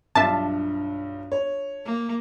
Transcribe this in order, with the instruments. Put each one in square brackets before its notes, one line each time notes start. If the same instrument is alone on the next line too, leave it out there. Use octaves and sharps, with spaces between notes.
[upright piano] B1 G2 [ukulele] D4 F4 E5 [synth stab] A5
[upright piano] C#5
[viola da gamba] A#3